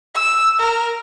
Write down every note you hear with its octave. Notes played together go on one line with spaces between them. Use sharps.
E6
A#4